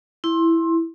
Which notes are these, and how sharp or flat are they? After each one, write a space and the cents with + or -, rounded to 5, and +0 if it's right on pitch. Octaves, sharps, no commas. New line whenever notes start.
E4 +0 C6 +20